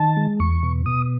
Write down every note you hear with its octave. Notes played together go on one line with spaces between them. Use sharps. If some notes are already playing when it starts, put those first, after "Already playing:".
Already playing: D#3 A5
G#3
E2 C#6
B2
B2 D#6